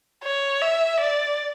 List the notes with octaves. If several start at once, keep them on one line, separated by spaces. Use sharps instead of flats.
C#5
E5
D5